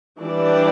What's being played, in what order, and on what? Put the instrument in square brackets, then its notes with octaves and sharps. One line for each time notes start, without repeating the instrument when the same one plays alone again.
[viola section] E3 G3 D4 G4 D5